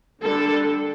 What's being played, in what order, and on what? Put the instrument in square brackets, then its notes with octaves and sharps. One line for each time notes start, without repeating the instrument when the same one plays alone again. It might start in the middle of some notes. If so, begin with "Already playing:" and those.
[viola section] D3 G3 D4 A4